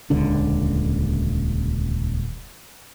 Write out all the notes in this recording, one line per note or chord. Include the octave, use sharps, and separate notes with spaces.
D#1 C#2 D3 D4